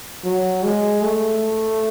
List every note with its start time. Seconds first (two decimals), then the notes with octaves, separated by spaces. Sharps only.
0.24 F#3
0.64 G#3
1.04 A3